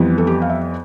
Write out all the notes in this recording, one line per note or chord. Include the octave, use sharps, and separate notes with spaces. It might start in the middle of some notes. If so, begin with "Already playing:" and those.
Already playing: F2 E3 G3 B3
A4
G4
F5
E5